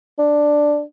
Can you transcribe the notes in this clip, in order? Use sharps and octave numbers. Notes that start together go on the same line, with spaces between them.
D4